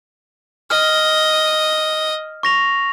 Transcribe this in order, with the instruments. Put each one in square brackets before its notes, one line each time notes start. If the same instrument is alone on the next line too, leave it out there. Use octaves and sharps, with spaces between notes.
[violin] D#5 [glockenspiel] F6
[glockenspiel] C#6 A#6 F7